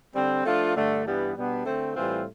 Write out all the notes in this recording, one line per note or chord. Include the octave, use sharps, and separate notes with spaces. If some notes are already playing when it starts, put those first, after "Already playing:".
D3 G3 C4
F3 A3 D4 F4
G2 D3 A3
G2 E3 G3 B3
B2 G3 B3 D4
D3 A3 C4
A2 E3 G3 C4 F4